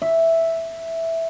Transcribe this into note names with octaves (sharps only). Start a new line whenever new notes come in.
E5